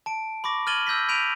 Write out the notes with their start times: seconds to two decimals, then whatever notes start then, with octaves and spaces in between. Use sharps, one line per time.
0.06 A5 D7
0.44 B5 C#6 D6 A#6
0.67 F6 G#6 A6 D#7 F#7 G7
0.87 E6 G6 A#6 B6
1.08 B5 G6 B6 D7 D#7 F7